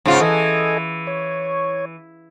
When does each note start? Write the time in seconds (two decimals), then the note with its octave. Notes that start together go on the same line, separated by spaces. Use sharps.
0.06 G#2 C#3 F4
0.20 E3 A4 D#5 G#5
1.07 C#5